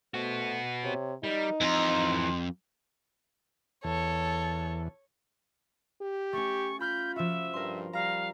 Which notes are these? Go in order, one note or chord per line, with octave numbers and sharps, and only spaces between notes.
A3 B3 F#4 C5
C3 C#5
G3 D#4 A#4
F2 E3 A#5 C6
E2 A4 C#5
G4
A3 C#4 C#6
F4 B5 F6 G6 B6
F3 F#4 E5
G2 A#4 C6
G3 F5 A#5 F6